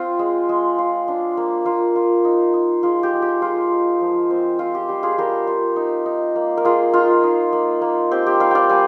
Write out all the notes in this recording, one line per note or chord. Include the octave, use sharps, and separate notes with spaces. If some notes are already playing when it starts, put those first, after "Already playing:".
Already playing: C4 F4
G#3
G#3
F4
D4
A#3
A#3 F4
F4
D#4
D#4
G#3 F4
G4
G#3
G4
G#3 F4
D#4
F3
C4
C4 F4
G4
G3 G4
F4 G#4
G3 G4 A#4
F4
D#4
D#4
A#3
A#4
A#3 F4 G#4
D#4 F4
D#4
A#3
A#3
C4 G4
G4
G3 D5 F5
D5 F5 G5
G3 F5 G#5